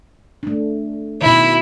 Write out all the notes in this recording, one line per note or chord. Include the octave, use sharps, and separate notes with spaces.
A3 D4
B2 D#3 E4